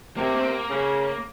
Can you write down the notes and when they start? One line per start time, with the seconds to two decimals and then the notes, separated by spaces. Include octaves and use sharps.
0.16 C3 A#3
0.34 C4
0.43 A#3
0.69 C#3